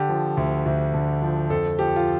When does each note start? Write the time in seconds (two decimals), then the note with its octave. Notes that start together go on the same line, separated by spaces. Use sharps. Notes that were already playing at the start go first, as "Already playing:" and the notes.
Already playing: D3 G4
0.09 F3
0.37 D2
0.66 D2
0.94 D3
1.22 F3
1.50 F2 A4
1.79 F3 G4
1.96 F4